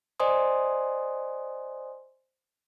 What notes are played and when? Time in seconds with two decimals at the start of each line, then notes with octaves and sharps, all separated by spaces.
0.20 C5 D5 D#5 G#5 C6 D#6